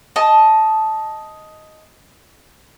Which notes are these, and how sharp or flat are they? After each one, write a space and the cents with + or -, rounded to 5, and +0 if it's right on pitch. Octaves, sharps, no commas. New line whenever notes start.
D#5 +5 A5 -10